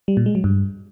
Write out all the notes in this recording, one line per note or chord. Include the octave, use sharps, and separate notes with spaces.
G3
A#2
G#3
F#3
G2